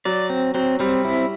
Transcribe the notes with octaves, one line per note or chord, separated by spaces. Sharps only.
F#3 D5
C4
F#3 C4
G3 C4
E4